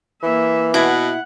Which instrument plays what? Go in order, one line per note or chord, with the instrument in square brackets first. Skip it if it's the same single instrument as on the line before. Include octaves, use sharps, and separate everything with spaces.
[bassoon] E3 [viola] A#3 E5
[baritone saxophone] B2 [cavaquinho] E4 [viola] F#5